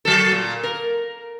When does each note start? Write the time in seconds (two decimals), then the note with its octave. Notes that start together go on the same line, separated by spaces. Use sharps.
0.05 F#3 A4
0.32 A#2
0.63 A#4